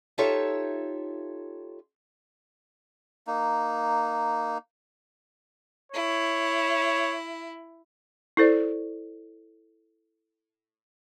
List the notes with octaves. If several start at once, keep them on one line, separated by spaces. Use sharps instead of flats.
D#4 F4 G4 A4 C#5 E5
A#3 D#4
E4 C#5
E4 A4 C5 D5